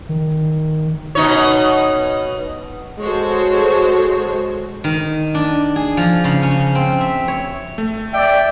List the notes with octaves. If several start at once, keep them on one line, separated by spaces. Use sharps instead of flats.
D#3
B2 D#4 C#5
G#3 F#4 A4 C5 C#5
D#3
D4
G#4
F3
C#3
C#4
C4
E5
C#5
A3
D5 E5 G5